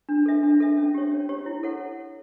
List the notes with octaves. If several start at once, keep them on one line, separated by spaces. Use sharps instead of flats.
D4
A4 E5
D4
A4 E5
C#4
G4 C#5
C#4
G4 C#5
E4
A4 C#5 F#5